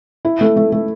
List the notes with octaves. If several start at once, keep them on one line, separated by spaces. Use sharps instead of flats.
E4
A3
A3
A3